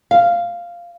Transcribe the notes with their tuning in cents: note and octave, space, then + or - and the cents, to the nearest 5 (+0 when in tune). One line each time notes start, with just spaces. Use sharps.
F5 -5